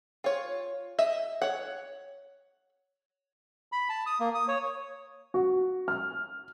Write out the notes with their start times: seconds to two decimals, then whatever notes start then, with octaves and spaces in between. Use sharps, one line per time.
0.24 F4 C#5
0.99 D#5 E5
1.42 C#5 F#5
3.72 B5
3.89 A5
4.06 D#6
4.20 A#3
4.35 D#6
4.48 C#5
5.34 F#4
5.88 F6